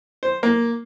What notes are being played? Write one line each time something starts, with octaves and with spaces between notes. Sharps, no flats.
C5
A#3